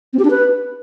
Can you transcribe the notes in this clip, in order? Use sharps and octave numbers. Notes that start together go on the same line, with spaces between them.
C4
G4
D4
B4